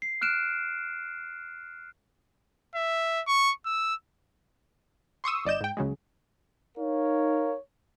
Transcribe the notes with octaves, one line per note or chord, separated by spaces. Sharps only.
C7
F6 F#6 D7 E7
E5
C#6
E6
C6 C#6 D#6 E6
G1 D5 D#5 G6 E7
G#2 G5
C#2 C#3 F#3 G#3
D#4 A#4 C#5 F5